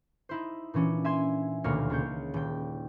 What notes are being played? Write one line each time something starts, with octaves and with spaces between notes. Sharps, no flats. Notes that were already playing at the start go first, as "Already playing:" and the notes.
D#4 E4 C5
A#2 E3 C#4 D4
E5 G#5 C6 G#6
D#1 D2 B2 A#3 C#5 F6
C#2 C#5 G6
D#1 G5